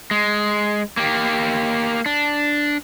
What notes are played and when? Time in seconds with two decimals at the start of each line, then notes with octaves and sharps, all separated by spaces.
0.11 G#3
0.97 A#3 G4
2.06 D4